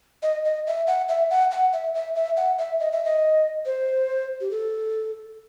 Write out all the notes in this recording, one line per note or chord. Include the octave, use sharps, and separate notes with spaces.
D#5
D#5
E5
F#5
E5
F#5
F#5
E5
E5
E5
F#5
E5
D#5
E5
D#5
C5
G4
A4